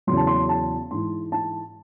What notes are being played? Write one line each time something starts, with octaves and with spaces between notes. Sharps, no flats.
E2 C#3 F#3 C6
A5
C6
A5
G#2 E3 C6
A5